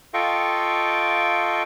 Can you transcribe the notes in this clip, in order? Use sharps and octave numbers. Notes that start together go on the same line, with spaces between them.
F4 A4 D#5 F5 G5 C#6